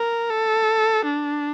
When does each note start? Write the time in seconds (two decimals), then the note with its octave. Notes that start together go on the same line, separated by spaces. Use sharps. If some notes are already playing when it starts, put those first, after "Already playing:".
Already playing: A#4
0.30 A4
1.05 D4